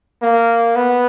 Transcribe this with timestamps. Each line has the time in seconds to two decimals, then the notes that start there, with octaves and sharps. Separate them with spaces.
0.22 A#3
0.76 B3